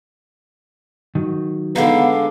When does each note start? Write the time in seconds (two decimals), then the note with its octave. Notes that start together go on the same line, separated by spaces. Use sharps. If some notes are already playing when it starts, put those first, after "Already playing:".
1.15 D#3 F#3
1.76 D3 G#3 B3 D#4 F5